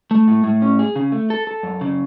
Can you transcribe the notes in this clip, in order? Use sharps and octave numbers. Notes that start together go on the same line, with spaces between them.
A3
A2
A2
C#4
G#4
C#3
A3
A4
A4
F#2
C#3